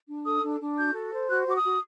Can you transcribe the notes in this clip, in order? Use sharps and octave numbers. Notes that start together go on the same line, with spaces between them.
D4
A4 D#6
D4
D4
F#4 G6
A4
C5
F#4 F#6
F#4 D6
D#6
F#4